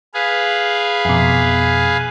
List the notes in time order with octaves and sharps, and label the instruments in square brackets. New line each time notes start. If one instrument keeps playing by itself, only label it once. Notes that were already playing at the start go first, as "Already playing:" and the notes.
[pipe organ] G#4 B4 F5
[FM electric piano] F2 B2